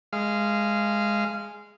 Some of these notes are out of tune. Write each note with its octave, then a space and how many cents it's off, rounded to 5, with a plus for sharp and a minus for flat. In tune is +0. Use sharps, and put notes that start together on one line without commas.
G#3 +0 F5 -20